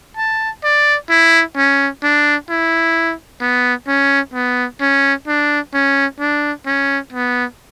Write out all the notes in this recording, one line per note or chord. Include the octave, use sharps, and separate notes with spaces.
A5
D5
E4
C#4
D4
E4
B3
C#4
B3
C#4
D4
C#4
D4
C#4
B3